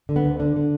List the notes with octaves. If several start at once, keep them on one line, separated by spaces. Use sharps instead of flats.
D3
B3
D2
D3 D4
D3